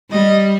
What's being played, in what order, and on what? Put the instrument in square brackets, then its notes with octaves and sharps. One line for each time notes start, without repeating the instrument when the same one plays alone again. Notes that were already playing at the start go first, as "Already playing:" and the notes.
[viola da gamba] G3 [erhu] D#5